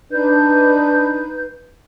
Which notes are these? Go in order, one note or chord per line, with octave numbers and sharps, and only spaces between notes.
D4 D#4 B4 G6